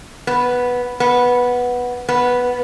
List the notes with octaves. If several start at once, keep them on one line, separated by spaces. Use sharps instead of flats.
B3
B3
B3